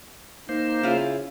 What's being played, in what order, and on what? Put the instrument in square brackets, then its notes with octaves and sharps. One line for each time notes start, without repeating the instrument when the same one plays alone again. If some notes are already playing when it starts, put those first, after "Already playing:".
[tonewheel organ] A#3 C5 [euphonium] D#4
[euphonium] C#3 [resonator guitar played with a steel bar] E4 F4